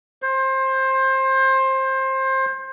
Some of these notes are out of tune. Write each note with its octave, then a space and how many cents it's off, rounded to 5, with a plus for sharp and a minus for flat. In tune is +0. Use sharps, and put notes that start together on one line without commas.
C5 +20